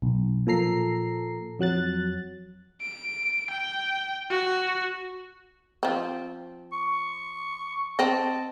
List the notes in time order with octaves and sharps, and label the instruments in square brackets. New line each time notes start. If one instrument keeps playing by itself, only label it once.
[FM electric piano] B1
A#2 F3 A4 A#5 C7
F2 F#3 F#6 A6
[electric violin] D7
G5
F#4
[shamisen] F3 C4
[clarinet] C#6
[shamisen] C4 D#5 [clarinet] A5